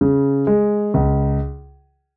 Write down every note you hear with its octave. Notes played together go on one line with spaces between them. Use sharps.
C#3
G#3
C#2